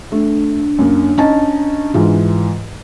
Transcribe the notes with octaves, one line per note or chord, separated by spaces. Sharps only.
A3 D4
F#2 A#3
C#4 D#4 A5
G#2 E3 F4